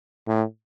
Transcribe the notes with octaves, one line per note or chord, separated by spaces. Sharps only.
A2